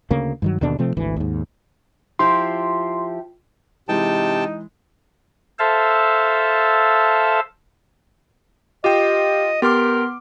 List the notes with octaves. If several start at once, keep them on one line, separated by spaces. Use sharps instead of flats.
D2 C#3 A#3
G2 D#3 F#3
D#2 B2 D3 D4
C3 F3 A3 C4
G#1 D2 E3
D#2 G#2
F3 E4 G4 C6
C3 E3 G#3 D#4 G5 A5
A4 C5 E5 F5 A5
F4 G4 D#5 G5
B3 G4 A#4 C6 D6 F6